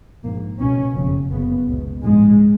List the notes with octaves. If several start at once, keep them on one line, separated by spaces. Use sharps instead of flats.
A#1 G#2 A#3
C#2 B2 C#4
F#1 F2 C#3
F#1 F#2 C#3 B3
C#2 B2
A#1 G#2 G#3